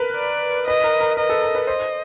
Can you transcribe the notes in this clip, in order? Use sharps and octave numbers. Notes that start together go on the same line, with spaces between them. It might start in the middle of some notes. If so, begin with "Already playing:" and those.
Already playing: A#4 B4
D5
B4 D#5
A#4
A#4
A#4 D#5
A4
A#4
B4
C5 D#5